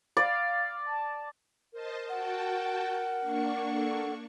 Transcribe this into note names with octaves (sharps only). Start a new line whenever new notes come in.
D5 F5
A5
A#4 C5 D#5 A5
F#4 F#5 G5 A5
A#3 D4 C#6
A4